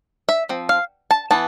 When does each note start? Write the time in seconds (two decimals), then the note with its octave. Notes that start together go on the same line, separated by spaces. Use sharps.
0.29 E5
0.49 F3 C4
0.69 F5
1.11 A5
1.31 E3 B3 A5